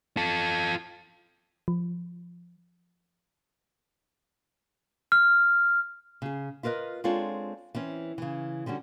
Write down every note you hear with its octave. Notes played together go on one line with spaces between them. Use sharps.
F4 A4
F3
F6
C#3 G#4
E4 F4 A#4 B4 D#5
G#3 C4 D4 F4 A4 C#5
E3 C4 C#4
C#3 E3
D3 G3 C#4 F#4